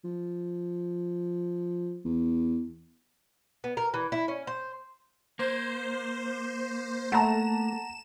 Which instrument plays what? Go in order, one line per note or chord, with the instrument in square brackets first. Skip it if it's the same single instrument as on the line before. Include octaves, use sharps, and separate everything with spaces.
[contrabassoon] F3
E2
[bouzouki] B3
A#4
E3
E4
C#4
C5
[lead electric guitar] A#3 [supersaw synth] C5
[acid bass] A3 [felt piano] F#5 A5 A#5 [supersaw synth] E7